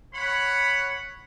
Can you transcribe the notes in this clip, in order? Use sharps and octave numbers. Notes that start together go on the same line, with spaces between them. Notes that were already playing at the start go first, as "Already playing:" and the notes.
C#5 F#5 B5